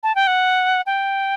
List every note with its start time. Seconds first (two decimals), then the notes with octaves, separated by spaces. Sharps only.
0.03 A5
0.15 G5
0.27 F#5
0.86 G5